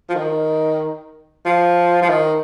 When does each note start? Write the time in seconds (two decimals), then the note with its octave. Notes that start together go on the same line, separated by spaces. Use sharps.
0.09 F3
0.15 D#3
1.45 F3
2.02 F3
2.09 D#3